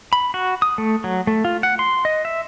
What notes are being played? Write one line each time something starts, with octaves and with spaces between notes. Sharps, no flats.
B5
F#4
D#6
A3
F#3
A3
F4
F#5
C6
D#5
E5